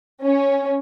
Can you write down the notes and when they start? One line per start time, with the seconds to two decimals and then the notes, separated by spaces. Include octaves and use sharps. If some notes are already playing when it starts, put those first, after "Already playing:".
0.23 C#4